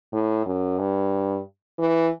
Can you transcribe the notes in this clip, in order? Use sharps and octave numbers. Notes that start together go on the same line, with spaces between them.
A2
F#2
G2
E3